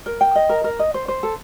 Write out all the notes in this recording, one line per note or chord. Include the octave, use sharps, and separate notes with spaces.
A#4
G5
D#5
A#4
A#4
D#5
C5
C5
A4